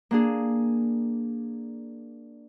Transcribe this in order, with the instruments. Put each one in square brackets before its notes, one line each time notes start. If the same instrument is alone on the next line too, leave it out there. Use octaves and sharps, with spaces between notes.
[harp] A#3 D4 G#4